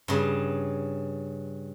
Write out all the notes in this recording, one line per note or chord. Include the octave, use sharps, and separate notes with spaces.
G2 C#3